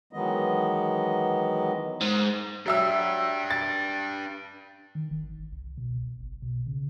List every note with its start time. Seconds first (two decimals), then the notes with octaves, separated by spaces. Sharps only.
0.13 D#3 E3 F#3 G#3 B3 D#5
2.01 G#2
2.66 F#3 D4 G4 E5 E6
3.50 A6
4.95 D#3
5.11 F1
5.23 G#1
5.52 C2
5.78 B2
6.02 G1
6.21 B1
6.42 B2
6.66 C#3